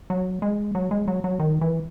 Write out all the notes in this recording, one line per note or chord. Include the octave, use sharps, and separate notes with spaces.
F#3
G#3
F#3
G#3
F#3
F#3
D#3
E3